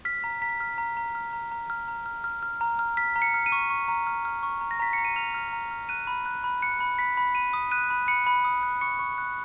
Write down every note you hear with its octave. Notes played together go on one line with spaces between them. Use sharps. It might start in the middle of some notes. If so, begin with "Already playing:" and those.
F6 B6
A#5
A#5 B6
F6
A#5
A#5
F6
A#5
A#5
F6
A#5
F6
F6
F6
A#5
F6
F6 B6
A#5
C#7
F6
D#7
C#6
C#6
A#5
F6
F6
C#6
A#5
A#6
A#5 B6
A#5 C#7
D#7
F6 F7
F6
A#5
F6
F#6 D#7
B5
F#6
B5
F#6 C#7
B5
B5 B6
B5
B5 D#7
D#6
F#6 D#7
B5
B5 C#7
B5
D#6
F#6
C#6 C#7
C#6
F#6